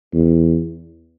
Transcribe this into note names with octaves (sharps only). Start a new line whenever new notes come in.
E2